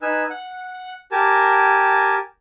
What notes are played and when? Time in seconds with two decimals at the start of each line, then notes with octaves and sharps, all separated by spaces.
0.02 D#4 B4 G#5 E6
0.30 F#5
1.12 G4 A#4 G#5 A5